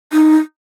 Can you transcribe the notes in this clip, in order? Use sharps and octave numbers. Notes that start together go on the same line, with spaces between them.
D#4